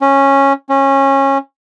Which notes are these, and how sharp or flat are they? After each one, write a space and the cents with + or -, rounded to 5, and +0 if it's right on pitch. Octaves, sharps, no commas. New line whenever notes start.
C#4 -10
C#4 -20